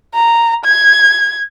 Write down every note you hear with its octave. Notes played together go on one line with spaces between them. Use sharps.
A#5
G#6